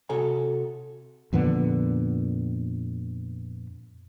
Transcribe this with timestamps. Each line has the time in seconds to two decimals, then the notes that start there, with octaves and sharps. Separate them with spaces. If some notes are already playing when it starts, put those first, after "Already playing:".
0.09 C3 F#4 A4 C#5 G#5 A#5
1.33 F2 A#2 D3 B3